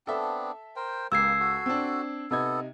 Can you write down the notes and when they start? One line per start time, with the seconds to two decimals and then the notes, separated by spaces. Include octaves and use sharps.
0.07 B3 C4 D4 A4 E5
0.76 A#4 C5 G5
1.12 C#2 A#3 G4 E6 G#6 C7
1.40 F#4 A4
1.66 C4 D4
2.31 C3 B3 D#4 A4 G#6